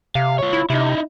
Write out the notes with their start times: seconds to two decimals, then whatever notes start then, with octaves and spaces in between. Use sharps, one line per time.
0.15 C3 F5
0.39 F4 C#5
0.53 E4
0.70 C3 D#4 E4